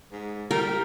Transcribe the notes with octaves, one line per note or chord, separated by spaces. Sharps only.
G#2
G3 A#4